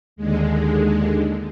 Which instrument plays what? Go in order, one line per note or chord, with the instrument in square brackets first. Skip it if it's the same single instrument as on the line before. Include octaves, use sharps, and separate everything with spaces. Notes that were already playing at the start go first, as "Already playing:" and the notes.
[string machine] D#2 D3 G#3